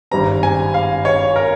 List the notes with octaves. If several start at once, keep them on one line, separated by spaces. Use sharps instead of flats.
G#1 G2 G3 C4 A#5
G#5
F5
C#5
A#4